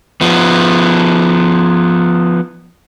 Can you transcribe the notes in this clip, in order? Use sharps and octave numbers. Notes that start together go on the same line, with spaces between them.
F3 B3